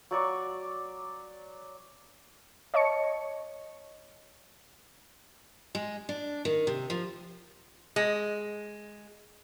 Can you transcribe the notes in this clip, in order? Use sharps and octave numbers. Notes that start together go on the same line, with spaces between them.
F#3 D5 C#6
C#5 D#5 A5 C#6 C#7
G#3
D4
D#3
C3
F3
G#3